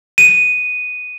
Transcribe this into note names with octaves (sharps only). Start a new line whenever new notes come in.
D#7